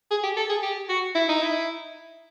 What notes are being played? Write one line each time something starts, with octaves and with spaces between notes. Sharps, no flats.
G#4
G4
A4
G#4
G4
F#4
E4
D#4
E4